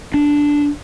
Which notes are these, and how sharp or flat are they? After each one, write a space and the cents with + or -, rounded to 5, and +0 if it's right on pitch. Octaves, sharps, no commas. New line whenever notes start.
D4 -5